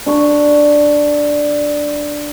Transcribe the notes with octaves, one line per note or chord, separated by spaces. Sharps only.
D4 C#6